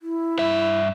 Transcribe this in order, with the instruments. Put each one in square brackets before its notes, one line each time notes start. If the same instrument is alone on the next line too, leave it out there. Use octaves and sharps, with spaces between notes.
[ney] E4
[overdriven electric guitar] G2 E5